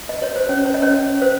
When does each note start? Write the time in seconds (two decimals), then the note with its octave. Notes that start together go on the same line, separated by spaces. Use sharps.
0.09 D#5
0.22 C#5
0.36 C5
0.49 C#4 C#5
0.66 C#5
0.74 D#5
0.82 C#4 C#5
1.22 C5